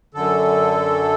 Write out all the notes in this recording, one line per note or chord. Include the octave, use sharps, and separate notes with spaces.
F#2 D3 A4